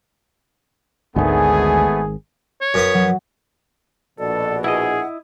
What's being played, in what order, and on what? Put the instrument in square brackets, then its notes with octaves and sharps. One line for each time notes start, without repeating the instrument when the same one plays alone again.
[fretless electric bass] G#1 G#2 D#3 [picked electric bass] D2 [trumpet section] A3 B3 G#5 [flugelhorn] G#4
[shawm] C#5
[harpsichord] F#2 B3 D#6
[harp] F#3
[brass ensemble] A#1 B2 [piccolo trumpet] A4 [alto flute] D5
[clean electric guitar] E4 D#5 [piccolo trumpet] G#4 [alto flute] F#5